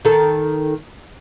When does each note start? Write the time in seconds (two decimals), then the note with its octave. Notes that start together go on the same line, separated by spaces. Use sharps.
0.05 D#3 A4